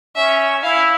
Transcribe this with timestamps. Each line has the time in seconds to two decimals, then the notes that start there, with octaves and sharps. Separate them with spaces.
0.16 C#4 E5
0.63 E4 F5